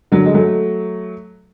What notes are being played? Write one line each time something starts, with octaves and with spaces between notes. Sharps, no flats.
D3 F#3
G#3
F#3 A3